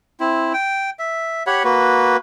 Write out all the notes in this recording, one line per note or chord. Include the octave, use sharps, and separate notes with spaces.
C4 E4
G5
E5
G4 C#5 F#5 B5
A#3 F#4 B4